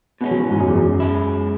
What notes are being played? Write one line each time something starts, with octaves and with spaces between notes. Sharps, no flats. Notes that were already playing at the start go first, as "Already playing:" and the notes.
B2 G#3 B3 C#4
F#3
E3
G#2
F#2
E2
F#2
C#3 G#3 E4